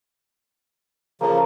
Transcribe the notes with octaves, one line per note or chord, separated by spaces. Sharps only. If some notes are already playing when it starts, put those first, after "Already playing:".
C#3 F3 A#3 A4